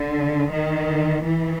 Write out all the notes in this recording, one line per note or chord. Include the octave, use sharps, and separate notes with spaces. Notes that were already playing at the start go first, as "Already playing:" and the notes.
Already playing: D3
D#3
E3